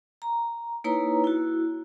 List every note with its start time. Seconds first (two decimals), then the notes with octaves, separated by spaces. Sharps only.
0.22 A#5
0.84 A#3 D#4 E4 B4 C#5 A#5
1.24 E4 F#4